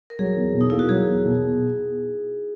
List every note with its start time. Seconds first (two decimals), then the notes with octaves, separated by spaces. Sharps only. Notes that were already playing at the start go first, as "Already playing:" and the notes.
0.10 A#4
0.19 F#3 G#4
0.36 E2
0.54 B2
0.61 D#4
0.70 A#3 E4
0.79 F#4
0.89 F#3 G#4
1.07 E2
1.25 B2